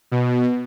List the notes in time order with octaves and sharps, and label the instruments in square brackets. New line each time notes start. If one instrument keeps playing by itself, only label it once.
[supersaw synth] B2